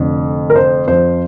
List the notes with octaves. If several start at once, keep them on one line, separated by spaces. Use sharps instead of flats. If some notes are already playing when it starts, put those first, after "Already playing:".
Already playing: F1 F2 D3
A#4
C5
F2 F3 C5